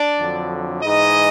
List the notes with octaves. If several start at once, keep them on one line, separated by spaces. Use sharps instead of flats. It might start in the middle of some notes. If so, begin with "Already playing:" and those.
Already playing: D4 D5
F2 D3 F#3
G#2 E3 G#3 D#4 D#5